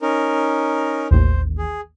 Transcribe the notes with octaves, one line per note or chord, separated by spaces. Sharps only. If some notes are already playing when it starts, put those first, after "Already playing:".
C#4 D#4 A#4
A1 D#2 C5
G#4